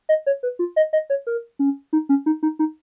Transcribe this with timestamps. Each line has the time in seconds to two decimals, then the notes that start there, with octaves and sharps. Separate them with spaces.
0.09 D#5
0.26 C#5
0.43 B4
0.59 F4
0.76 D#5
0.93 D#5
1.10 C#5
1.27 A#4
1.59 C#4
1.93 D#4
2.09 C#4
2.26 D#4
2.43 D#4
2.59 D#4